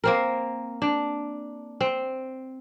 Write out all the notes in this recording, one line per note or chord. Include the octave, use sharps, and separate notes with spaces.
A#3 C4 A#4
D4
C4